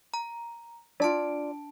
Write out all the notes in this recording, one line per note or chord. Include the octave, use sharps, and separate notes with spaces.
A#5
D4 F4 D5 A5 D7